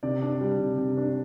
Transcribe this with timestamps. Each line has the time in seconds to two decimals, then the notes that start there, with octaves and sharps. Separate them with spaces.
0.03 C3 D5
0.22 D4
0.41 G3
0.59 C3
0.78 C3
0.97 D4